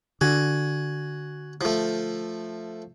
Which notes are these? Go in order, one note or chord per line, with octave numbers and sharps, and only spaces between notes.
D3 F#4 G#5
F3 A3